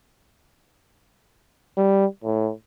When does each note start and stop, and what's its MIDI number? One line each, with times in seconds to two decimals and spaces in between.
1.77 2.06 55
2.24 2.51 45